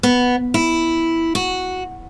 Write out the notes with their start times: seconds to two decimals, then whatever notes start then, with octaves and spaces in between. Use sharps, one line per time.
0.03 B3
0.54 E4
1.35 F#4